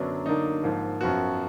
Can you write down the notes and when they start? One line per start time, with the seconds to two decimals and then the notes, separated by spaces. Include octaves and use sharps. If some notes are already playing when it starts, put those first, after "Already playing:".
Already playing: F#2 D3 F#3 B3 D4
0.26 D3 F#3 A#3 D4 D#4
0.63 G#2 F3 A#3
1.01 F#2 F3 B3 F#4